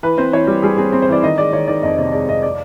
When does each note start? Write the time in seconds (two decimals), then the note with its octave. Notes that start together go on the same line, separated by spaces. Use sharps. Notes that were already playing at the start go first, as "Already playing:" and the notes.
0.03 E3 B4
0.18 C4 C5
0.32 E3 C#5
0.47 G3
0.62 G3 G#4
0.77 C4 G#4
0.92 C4
1.02 C5
1.08 E3 D5
1.23 D#3 D#5
1.38 G#3 D5
1.53 D#3 C#5
1.68 D#3 D5
1.83 F2 D#5
1.98 C3 D5
2.13 G#3 D5
2.28 F2 D#5
2.43 D5